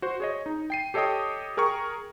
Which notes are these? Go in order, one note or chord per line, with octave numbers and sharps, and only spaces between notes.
F#4 C5
G#4 C#5 D#5
D#4
G5 C7 D#7
G4 A4 C#5 D#5 G5 D#6
G#4 A#4 G5 C#6